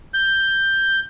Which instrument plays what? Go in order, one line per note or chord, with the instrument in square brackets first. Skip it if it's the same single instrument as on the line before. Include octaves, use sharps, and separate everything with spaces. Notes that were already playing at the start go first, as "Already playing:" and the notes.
[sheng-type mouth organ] G6